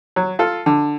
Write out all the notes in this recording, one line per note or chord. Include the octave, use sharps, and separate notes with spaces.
F#3
F4 A4
D3